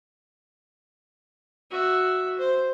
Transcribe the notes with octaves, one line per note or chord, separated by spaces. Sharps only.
F#4 E5
C5